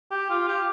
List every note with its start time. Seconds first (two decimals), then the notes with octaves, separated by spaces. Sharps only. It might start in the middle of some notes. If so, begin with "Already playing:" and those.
0.11 G4
0.30 F4
0.48 G4